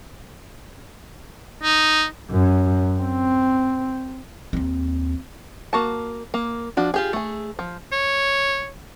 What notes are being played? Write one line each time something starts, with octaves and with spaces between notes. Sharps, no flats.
D#4
F#2
C4
D#2 C4
A#3 F#4 A5
A#3
F3 D4 F#4
F4 G4 G#4
A3 G#4
F3
C#5